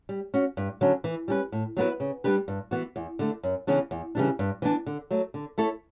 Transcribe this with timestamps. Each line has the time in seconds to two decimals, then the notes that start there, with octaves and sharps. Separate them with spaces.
0.09 G3
0.34 C#4 F#4
0.57 G2
0.81 D3 F#3 C#4
1.04 E3
1.28 G3 C#4 G4 B4
1.52 A2
1.77 F#3 B3 E4 B4
2.00 C#3
2.24 G3 D4 G4 B4
2.48 G2
2.71 E3 B3 F#4
2.96 E2
3.19 D3 A3
3.43 F#2
3.67 C#3 E3 B3 D4
3.91 E2
4.15 C#3 E3 G3 D4
4.39 G2
4.62 E3 B3 D4
4.86 D3
5.11 F#3 A3
5.34 D3
5.58 A3 E4 A4 C#5